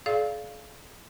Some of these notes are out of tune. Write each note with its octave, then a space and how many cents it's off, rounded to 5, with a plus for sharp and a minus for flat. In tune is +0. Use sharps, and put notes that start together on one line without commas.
G#4 +45 D5 +0 F5 -10